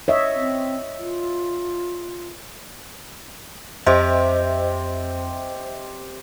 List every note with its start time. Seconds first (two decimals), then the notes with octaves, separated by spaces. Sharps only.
0.08 C#5 D#5 E5
0.35 C4
0.98 F4
3.86 F2 C4 G4 C5 D#5 E5